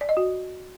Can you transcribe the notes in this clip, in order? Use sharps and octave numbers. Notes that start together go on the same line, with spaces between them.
D5
D#5
F#4